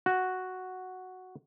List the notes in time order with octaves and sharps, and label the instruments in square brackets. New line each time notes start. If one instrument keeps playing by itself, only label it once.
[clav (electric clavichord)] F#4